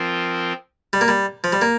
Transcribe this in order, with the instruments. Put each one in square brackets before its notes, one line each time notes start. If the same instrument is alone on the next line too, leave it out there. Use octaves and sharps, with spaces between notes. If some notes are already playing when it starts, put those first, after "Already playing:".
Already playing: [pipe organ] F3 C4 F4 A#4
[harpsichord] G3
A#3
G3
F3
G3
A#3